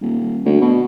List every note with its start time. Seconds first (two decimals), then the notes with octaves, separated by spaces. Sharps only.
0.01 D#1
0.45 D2
0.61 B2